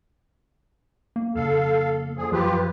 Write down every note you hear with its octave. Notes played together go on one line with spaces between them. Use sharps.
A#3
F2 C#3 A4 F5
D3 F3 G#4
F#2 F3 F4 G4 B4